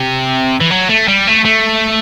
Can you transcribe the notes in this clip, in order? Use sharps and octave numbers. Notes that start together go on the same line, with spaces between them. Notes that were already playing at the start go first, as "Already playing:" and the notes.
Already playing: C3
E3
F#3
A3
G3
A3
A3